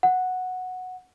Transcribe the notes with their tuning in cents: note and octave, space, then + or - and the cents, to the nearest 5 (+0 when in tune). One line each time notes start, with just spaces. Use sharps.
F#5 -5